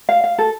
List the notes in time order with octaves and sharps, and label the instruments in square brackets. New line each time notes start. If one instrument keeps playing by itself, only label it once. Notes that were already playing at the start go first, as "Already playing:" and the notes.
[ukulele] F5
F5
A4